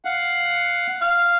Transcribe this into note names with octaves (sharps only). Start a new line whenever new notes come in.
F5 F#5
F5